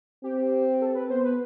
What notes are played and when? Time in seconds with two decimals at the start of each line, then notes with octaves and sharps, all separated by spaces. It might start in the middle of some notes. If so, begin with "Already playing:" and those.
0.24 C4 G4
0.81 A4
0.95 B4
1.10 B3 C5
1.25 B4